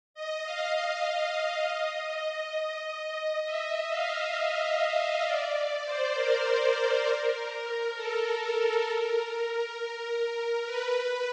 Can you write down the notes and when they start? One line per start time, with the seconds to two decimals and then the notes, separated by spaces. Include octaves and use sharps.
0.14 D#5
0.44 F5
0.73 D#5
3.44 E5
3.89 F5
4.34 F5
4.79 E5
5.25 D5
5.85 C5
6.14 A#4
7.95 A4
8.86 A#4
10.65 B4